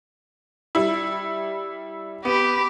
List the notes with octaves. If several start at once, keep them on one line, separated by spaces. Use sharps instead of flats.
G3 E4
B3 G4 B5